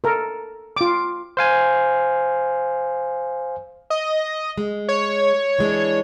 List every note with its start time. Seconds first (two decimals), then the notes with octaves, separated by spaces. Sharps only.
0.04 A4 A#4
0.76 F4 D6
1.37 C5 F5 G#5
3.90 D#5
4.58 G#3
4.88 C#5
5.59 E3 G#3 D4